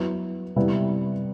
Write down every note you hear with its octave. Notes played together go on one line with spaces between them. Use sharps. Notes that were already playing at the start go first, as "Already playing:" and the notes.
Already playing: F#3 B3 E4
C3 G3 B3 E4